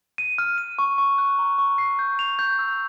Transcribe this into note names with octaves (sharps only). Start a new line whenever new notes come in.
D#7
F6
D#7
C#6
C#6
F#6
A#5
C#6
C7
G6
F7
G6
E6